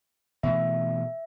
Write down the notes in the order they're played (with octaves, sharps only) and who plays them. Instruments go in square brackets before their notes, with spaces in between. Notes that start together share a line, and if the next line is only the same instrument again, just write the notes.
[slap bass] B2 E3 A3 [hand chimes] E5